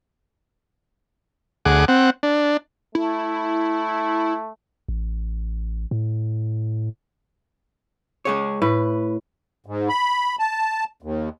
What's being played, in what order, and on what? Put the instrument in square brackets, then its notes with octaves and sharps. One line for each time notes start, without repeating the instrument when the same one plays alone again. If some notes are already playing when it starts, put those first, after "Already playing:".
[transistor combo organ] D2 G#4 F#5 D6
C4 F#5
D4
[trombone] A3 [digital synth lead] E4
[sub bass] A1
A2
[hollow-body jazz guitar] G#3 G#4 C#5
[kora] A2 [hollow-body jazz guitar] B4
[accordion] G#2
B5
A5
D#2